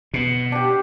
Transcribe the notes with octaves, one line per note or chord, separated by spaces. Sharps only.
B2
D4 G4